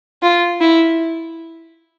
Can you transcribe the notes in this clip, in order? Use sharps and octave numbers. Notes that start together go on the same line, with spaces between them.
F4
E4